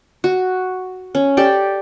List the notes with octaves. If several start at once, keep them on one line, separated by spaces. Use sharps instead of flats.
F#4
C#4
G4 A4 D5 G5